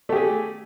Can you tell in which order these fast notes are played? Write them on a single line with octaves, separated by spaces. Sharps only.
A3 G4 G#4